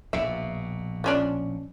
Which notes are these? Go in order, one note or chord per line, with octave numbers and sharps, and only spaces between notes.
A#1 B2 E5
F3 C#4 D4